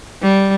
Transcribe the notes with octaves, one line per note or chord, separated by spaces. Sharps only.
G3